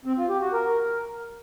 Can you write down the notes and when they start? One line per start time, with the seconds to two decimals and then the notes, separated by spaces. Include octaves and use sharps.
0.05 C4
0.17 F4
0.29 G4
0.41 F#4
0.53 A#4